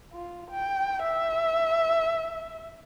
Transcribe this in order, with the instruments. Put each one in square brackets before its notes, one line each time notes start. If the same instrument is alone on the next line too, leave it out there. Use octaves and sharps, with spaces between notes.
[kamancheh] F4
G5
E5